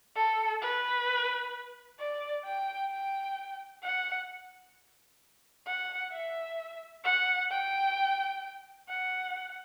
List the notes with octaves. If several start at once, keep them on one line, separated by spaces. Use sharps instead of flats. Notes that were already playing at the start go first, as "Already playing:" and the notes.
A4
B4
D5
G5
G5
F#5
F#5
E5
F#5
G5
F#5